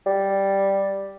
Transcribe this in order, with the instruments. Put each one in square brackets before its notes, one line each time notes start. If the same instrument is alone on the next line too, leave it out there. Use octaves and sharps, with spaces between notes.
[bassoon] G3